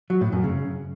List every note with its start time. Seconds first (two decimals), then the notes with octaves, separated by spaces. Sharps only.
0.10 F#3
0.21 A2
0.32 F#2
0.44 C#3